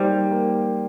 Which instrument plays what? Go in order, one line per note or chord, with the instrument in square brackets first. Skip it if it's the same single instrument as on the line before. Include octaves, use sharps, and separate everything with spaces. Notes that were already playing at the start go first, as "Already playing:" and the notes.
Already playing: [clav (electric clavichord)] G3 [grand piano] A#3 D#4 G4 C5
[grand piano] A#3